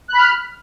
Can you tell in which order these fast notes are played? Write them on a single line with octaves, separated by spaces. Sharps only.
F#6 B5 F6